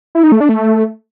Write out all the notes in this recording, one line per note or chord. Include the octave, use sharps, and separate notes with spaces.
E4
D#4
A3
D4
A3